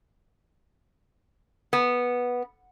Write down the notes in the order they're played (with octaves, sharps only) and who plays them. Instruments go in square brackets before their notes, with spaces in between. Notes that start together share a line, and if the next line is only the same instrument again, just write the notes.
[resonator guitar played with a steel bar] B3